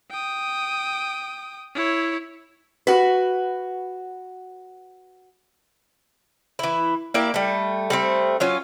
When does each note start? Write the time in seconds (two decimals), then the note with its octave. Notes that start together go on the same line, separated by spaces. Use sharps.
0.10 G5 D#6
1.74 E4 C#5
2.87 F#4 B4
6.59 E3 E4
7.14 A#3 E4 G4 D5
7.34 G3 A3
7.90 G3 A3 C4
8.40 F#3 C#4 F4